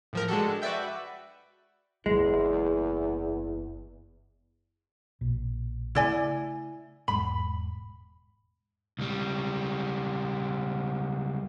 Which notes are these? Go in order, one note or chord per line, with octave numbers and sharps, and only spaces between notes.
A2 F3 A#4
G#3 D4 F#4 G4 A4
F#4 B4 D5 E5 G5
F#1 E2 G#3 A#3
A#1 B2
C#3 A3 E4 D5 G#5
E1 G#2 G#3 B5
C#2 G3